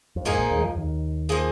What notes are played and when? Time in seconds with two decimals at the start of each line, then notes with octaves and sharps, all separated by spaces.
0.16 F2
0.25 G#2 F3 A#3 D#4 G#4
0.38 A#1 A#2
0.51 D#2 D#3
0.58 G#3
0.64 F2 F3
0.77 D#2 D#3
1.29 F3 A#3 G#4